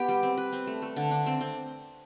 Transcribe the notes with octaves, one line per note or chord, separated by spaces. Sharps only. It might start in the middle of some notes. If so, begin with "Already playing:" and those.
Already playing: B3 G4
G3
C4
B4
C4
A3
A3
D3
D4
C4
C4